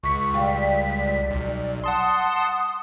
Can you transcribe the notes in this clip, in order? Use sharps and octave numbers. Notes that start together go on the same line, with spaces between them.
C#2 C#6 B6
G3 F5
D5
B1
F#5 A5 C6 D#6